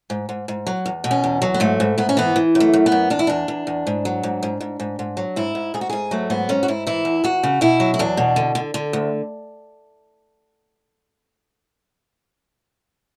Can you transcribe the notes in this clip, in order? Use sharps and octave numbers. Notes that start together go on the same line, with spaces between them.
G#2
G#2
G#2
F#3
E2
B2
C#4
E2
F#3
B3
G#2 A3
G#2
G#2 B3
C#4
E3 B3
E3
F#2
A3
F#2
B3
F#2
E2 D4
E4
E2 D4
E2
E2
G#2
F#3
G#2
G#2
G#2
G#2
G#2
F#3
G#2 E4
G#2
G#2 G#4
F#4
G#2 G#4
F#3 A3
G#2 B3
G#2 C#4
F#4
G#2 E4
E3 E4
E2
E2 F#4
C#3
B2 E4
F#3
E4
E2 D4
B2
D3
D3
D3
D2